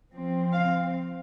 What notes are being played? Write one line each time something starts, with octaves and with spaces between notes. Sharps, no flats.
F3 C4
F5